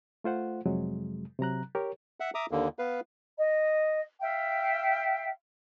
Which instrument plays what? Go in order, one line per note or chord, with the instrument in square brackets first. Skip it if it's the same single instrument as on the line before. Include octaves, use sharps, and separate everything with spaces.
[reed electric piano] A3 F4 C5 F#5
F2 C3 F#3 G#3
C3 F#3 A#5 F#6
G4 A#4 C#5
[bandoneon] E5 F#5
E5 A#5 D6 D#6
D#2 D3 A#3
B3 B4 F5
[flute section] D#5
E5 F5 G5